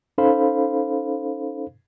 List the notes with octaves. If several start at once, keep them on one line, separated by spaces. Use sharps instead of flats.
C#4 D#4 A4 C5 F5 B5